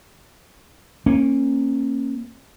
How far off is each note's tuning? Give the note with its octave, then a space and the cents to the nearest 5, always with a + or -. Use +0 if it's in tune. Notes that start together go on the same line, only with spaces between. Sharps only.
A#3 -10 C#4 -25